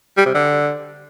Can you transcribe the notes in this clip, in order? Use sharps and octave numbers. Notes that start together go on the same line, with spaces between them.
G3
C3
D3